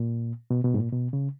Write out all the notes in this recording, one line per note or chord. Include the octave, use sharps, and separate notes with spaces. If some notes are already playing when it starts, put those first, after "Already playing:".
Already playing: A#2
B2
B2
G#2
A#2
B2
C#3